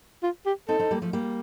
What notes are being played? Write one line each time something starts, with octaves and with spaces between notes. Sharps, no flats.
F4
G4
C4 D#4 A4
C4 D#4
G3 A#3
F3 A3
G3 A#3